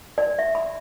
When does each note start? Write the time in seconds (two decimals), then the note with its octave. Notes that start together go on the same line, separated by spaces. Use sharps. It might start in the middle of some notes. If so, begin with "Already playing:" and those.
0.18 D5
0.39 E5
0.55 B5